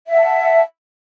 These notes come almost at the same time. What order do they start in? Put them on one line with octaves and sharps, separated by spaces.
E5 F#5 A5